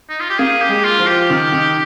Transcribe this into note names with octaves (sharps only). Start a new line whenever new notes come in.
D#4
F4
G4
A#3 G#4
G4
G#3
F4
F3
G4
D#3
D#3